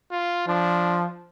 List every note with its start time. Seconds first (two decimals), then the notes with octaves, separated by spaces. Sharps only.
0.12 F4
0.48 F3 D4